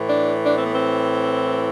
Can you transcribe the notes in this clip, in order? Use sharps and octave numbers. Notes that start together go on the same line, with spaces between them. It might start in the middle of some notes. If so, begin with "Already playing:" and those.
Already playing: A2 E3
D4
D4
C4
B3
C4